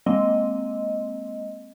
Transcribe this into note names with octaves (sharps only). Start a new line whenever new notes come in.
G#3 A#3 C4 D#5